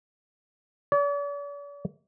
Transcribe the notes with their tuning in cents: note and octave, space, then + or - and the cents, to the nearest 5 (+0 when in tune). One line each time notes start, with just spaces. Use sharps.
D5 -45